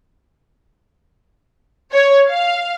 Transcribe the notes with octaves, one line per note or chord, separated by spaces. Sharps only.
C#5
F5